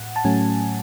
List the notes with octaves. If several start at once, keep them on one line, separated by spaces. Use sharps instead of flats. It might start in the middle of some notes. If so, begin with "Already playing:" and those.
Already playing: A2 F#5
A5
A2 F#3 A3 C#4 G#5